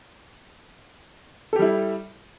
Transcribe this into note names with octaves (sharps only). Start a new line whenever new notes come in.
G3 E4 G4 A4